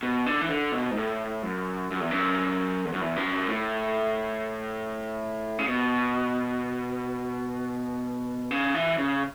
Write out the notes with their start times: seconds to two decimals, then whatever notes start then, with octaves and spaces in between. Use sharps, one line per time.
0.03 B2
0.26 D3
0.41 E3
0.49 D3
0.72 B2
0.91 G#2
0.97 A2
1.43 F#2
1.91 F#2
2.01 E2
2.11 F#2
2.85 E2
2.93 F#2
3.01 E2
3.16 F#2
3.48 A2
5.59 C#3
5.68 B2
8.51 C#3
8.74 E3
8.98 C#3